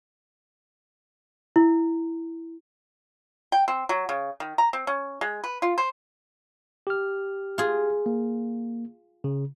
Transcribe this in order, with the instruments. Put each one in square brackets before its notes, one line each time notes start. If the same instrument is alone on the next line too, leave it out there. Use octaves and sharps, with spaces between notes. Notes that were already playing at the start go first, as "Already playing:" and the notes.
[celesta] E4
[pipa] G5
C4
F#3
C#3
D#3
A#5
C4
C#4
G#3
B4
F4
C5
[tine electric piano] G4 F6
[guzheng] F4 G#4
[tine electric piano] A#3
C#3